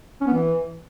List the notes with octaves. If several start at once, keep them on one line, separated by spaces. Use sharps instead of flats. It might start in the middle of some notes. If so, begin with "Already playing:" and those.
C#4
B3
E3